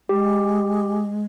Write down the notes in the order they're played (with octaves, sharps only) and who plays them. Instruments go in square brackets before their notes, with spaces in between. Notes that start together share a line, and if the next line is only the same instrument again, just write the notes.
[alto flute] G#3 [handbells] G4